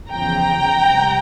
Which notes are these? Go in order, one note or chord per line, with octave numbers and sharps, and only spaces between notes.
E2 C#3 F3 G5 A#5
C#2 C3 G3